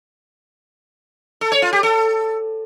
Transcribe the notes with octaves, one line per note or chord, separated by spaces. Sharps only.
A4
C#5
F4
G4
A4